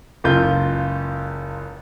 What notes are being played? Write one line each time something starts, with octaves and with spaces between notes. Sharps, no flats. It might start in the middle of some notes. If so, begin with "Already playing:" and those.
F#1 C#2 F4 G6